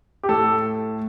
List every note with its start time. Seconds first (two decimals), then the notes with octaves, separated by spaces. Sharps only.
0.23 G4
0.29 A2 A4